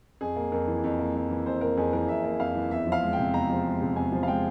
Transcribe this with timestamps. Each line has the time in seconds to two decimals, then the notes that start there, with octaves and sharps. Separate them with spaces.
0.21 F2 G#4
0.36 A#3
0.52 F2 A#4
0.67 E3
0.84 F2
0.99 A#3
1.15 F2
1.30 E3
1.46 F2 C5
1.61 A#3 A#4
1.77 F2 G#4
1.93 E3 A#4
2.08 F2 E5
2.24 A#3
2.40 F2 F5
2.56 E3
2.71 E2 E5
2.87 F3
2.92 F5
3.02 G#3
3.13 G5
3.18 C3
3.33 E2 A#5
3.49 F3
3.65 G#3
3.81 C3
3.96 E2 G#5
4.12 F3
4.23 F5
4.28 G#3 G5